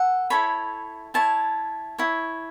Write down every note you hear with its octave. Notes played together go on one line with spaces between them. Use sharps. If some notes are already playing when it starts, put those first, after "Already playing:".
Already playing: A4 F#5
E4 A4 C#5 B5
E4 C#5 A5
E4 C#5